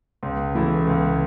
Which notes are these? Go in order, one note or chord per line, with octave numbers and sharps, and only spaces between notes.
C#2
C#3 E3 A3 E4
C#2